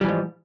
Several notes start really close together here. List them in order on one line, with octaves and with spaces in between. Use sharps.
G3 E3 F3 G#2